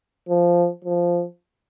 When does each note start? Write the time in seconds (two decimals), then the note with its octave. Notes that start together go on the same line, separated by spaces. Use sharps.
0.29 F3
0.84 F3